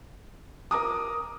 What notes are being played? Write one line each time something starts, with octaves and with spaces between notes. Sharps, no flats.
A#4 A#5 D6 D#6